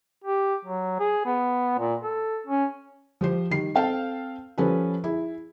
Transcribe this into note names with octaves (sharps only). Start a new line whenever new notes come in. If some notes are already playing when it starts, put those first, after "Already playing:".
G4
F#3
G#4
B3
A#2
A4
C#4
F3 G4 C5
D#3 G3 C7
C4 A4 F5 G5 A5
F3 G3 C#4 A4 B4
E4 G#4